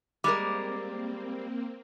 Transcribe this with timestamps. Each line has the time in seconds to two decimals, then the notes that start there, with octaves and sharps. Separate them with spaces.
0.24 G3 G#3 A#3 C4 A#4 D6